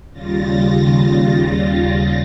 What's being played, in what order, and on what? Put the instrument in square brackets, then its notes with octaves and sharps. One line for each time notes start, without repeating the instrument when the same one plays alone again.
[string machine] D#2 C#3 G3 F4 A6 A#6